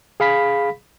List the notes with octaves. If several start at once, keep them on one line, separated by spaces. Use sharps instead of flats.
G#4 F5 B5 B6